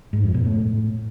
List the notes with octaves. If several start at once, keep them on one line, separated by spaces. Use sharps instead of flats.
G#2
F2
B2
A2